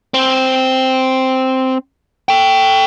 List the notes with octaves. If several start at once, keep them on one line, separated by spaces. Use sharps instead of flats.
C4
A4 G5